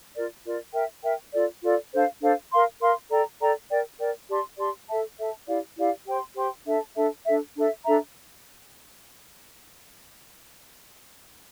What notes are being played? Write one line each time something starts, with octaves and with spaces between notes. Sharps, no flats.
F4 A#4 D5
F4 A#4 D5
A#4 E5 G5
A#4 E5 G5
F4 A4 D5
F4 A4 D5
D4 A4 C5 F5
D4 A4 C5 F5
A#4 F5 C6
A#4 F5 C6
A4 D5 G5 A#5
A4 D5 G5 A#5
A#4 D5 G5
A#4 D5 G5
G4 D5 A5 C6
G4 D5 A5 C6
A4 E5 A5
A4 E5 A5
E4 G4 D5 F5
E4 G4 D5 F5
G4 C5 G5 C6
G4 C5 G5 C6
D4 A4 E5 A5
D4 A4 E5 A5
D4 A4 E5
D4 A4 E5
D4 A4 E5 A#5